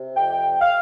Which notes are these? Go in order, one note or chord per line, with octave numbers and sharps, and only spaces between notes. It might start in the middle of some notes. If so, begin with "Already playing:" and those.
Already playing: C3
F2 G5
F5